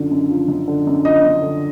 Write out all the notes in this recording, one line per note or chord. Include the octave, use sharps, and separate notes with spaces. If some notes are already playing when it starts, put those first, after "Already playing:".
Already playing: F#2 D3 F3
F#2
F3
F#2
D3
F#2
F3 D#5
F#2
D3